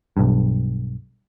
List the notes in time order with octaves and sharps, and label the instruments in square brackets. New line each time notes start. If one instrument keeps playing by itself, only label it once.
[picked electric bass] B1 G2